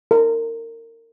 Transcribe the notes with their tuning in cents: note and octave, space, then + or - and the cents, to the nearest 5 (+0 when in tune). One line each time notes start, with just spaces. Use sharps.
A#4 -30